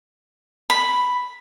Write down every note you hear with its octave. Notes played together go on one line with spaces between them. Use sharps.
B5